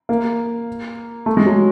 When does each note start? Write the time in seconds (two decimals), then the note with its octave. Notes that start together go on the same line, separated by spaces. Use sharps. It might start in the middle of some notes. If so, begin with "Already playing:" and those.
0.09 A#3
1.26 A3
1.37 G#3
1.46 F#3